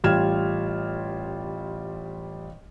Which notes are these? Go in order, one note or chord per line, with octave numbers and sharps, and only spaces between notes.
A1 G3 F4 F6 G#6 E7